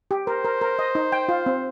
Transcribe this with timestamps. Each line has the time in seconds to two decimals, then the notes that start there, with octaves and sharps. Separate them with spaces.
0.11 G4
0.27 A#4 C5
0.44 A#4
0.61 A#4
0.79 D#5
0.95 D#4
1.12 G5
1.29 F4
1.46 C4